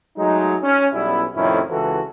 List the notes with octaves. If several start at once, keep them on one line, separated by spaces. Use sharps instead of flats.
F#3 G#3 A3 D#4
C#4
B1 G3 B3 C#4 E4
F2 A2 C3 D#3 C#4 E4
C#2 E3 F#4 A4